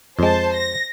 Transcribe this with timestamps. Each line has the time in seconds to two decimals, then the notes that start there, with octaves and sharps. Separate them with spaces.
0.19 F2 G#3 C5 A5
0.54 A#6